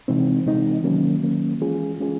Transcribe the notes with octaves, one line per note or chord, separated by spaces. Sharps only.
C3 E3 G#3 C4 D#4
C3 E3 G#3 C4 D#4
D#3 F#3 A#3 C#4
D#3 F#3 A#3 C#4
E3 G#3 C#4 F4 G#4
E3 G#3 C#4 F4 G#4